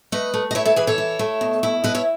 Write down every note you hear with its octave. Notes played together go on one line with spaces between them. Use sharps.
A3 B4 D#5
A3
D#5
E4 C#5 E5
A4 C#5
E3 G#4 B4
A4 C#5
E4
A3
B2
E4
B2 B4 D#5
C#5 E5